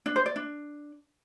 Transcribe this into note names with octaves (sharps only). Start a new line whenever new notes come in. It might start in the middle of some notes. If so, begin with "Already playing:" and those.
D4
C5
D5
D4